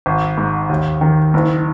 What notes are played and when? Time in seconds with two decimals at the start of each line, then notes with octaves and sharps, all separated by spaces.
0.06 G#1
0.38 G#2
0.69 D#2
1.01 D#3
1.34 F#1